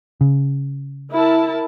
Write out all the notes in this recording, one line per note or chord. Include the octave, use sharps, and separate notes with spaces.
C#3
E4 A#4 A5